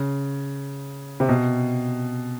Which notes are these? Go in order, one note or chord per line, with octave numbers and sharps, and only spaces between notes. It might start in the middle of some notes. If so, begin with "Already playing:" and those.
Already playing: C#3
C3
B2